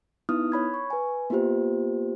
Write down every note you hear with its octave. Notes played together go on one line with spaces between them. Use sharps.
B3 D#4 E4 D#6 F6
C#5 B5 G#6
C#6
B4 G#5
A#3 B3 F4 G4 C5